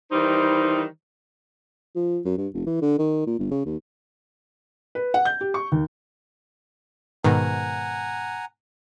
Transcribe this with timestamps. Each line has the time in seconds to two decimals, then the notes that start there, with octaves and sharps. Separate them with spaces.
0.12 D#3 E3 G3 D#4 C5
1.95 F3
2.25 F#2
2.38 G2
2.54 F1
2.66 E3
2.82 D3
2.99 D#3
3.27 A#2
3.39 G1
3.51 C#3
3.65 D#2
4.95 B4
5.14 F#5
5.25 G6
5.41 G4
5.54 C#6
5.72 D#2
7.24 G#2 B2 D#3 F#5 G#5 A#5